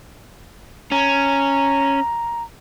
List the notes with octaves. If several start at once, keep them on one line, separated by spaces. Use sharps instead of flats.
C#4 A#5